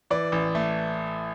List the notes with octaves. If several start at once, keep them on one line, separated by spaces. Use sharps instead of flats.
E3 D5
A1
A3